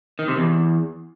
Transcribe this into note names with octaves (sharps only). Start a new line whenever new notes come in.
D#3
C3
E2